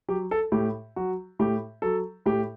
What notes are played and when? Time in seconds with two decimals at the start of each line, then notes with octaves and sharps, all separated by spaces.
0.08 F#3 G4
0.31 A4
0.52 A2 G4
0.96 F#3 F#4
1.39 A2 G4
1.82 F#3 A4
2.26 A2 G4